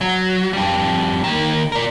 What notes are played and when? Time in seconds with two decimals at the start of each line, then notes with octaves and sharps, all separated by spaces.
0.01 F#3
0.53 F2 G3
1.24 D#3 A#3
1.72 A#4 D5